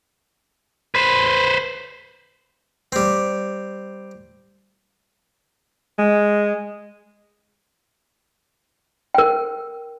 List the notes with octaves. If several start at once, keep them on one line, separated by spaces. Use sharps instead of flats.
B4 C5
G3 C4
G#3
A#4 G5